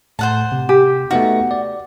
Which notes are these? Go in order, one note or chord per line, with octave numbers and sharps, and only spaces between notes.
A2 A3 C5 F#5 A5
C3
G4
A3 B3 D#4 F#4
D5